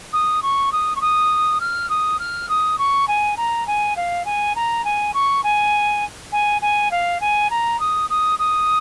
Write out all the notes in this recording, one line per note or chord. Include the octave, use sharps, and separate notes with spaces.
D#6
C#6
D#6
C#6
D#6
F6
D#6
F6
D#6
C#6
G#5
A#5
G#5
F5
G#5
A#5
G#5
C#6
G#5
G#5
G#5
F5
G#5
A#5
D#6
D#6
D#6